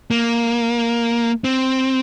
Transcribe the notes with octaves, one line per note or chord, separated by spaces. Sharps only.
A#3
C4